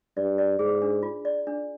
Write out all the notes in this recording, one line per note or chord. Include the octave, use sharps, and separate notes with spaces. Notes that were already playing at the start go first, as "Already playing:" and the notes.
G2 D5
D5
G#2 G#4
D4
F4
D5
D4